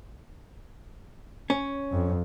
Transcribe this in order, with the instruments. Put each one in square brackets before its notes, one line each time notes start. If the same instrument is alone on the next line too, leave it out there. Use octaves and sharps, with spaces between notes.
[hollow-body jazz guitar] C#4
[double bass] F2